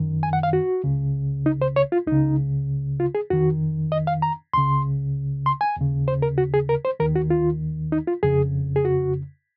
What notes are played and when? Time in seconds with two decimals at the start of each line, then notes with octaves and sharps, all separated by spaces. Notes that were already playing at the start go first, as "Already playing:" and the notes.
Already playing: F#2 D#3
0.23 G#5
0.33 F#5
0.43 F5
0.53 F#4
0.84 C#2 C#3
1.46 D#4
1.62 C5
1.76 C#5
1.92 F4
2.07 C#2 C#3 D#4
3.00 F4
3.15 G#4
3.30 F2 D#3 F#4
3.92 D#5
4.07 F5
4.22 A#5
4.53 C#2 C#3 C6
5.46 C6
5.61 G#5
5.77 D#2 C#3
6.08 C5
6.22 A#4
6.38 F#4
6.54 G#4
6.69 A#4
6.85 C5
7.00 D#2 D#3 A#4
7.15 F#4
7.30 F4
7.92 D#4
8.07 F4
8.23 F2 C#3 G#4
8.76 G#4
8.85 F#4